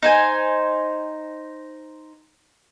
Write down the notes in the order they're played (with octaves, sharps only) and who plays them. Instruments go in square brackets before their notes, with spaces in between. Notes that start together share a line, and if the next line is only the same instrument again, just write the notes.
[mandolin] D#4 C5 G#5